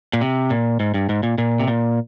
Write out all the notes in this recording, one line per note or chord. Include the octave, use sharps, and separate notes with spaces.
A#2
C3
A#2
G#2
G2
G#2
A#2
A#2
C3
A#2